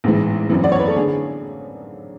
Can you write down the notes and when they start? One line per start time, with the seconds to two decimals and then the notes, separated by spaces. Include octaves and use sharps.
0.04 A1 G#2 E3
0.50 G#1 F#2 E3
0.64 D5
0.72 C#5
0.80 B4
0.88 A4
0.96 D3 G#4